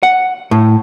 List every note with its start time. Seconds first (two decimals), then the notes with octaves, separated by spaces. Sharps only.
0.03 F#5
0.51 A2